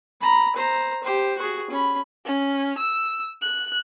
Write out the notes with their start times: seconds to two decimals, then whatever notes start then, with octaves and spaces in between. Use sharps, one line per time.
0.21 A#5 B5
0.56 C5 A#5
1.03 G4 C5
1.38 F#4 G#4
1.70 C#4 B5
2.25 C#4
2.78 E6
3.42 F#6